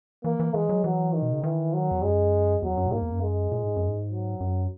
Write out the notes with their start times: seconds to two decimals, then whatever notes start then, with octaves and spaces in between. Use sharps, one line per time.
0.24 E3 A#3
0.40 E3
0.54 E3 G#3
0.69 F#3
0.84 E3 F#3
1.13 D#3
1.22 B2
1.33 C#3
1.44 D#3 E3
1.73 F#3
1.91 E2
2.02 F#2 G#3
2.62 E2 F#3
2.77 F#2
2.86 A#2
2.92 G#2 A#3
3.02 E2
3.12 F#2
3.22 G#3
3.52 A#2
3.63 G#2
3.76 F#2
3.88 G#2
4.11 F#3
4.40 F#2